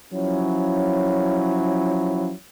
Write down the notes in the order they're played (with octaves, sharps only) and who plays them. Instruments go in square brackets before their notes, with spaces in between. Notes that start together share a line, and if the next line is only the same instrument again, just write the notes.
[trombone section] F3 F#3 C#4 E4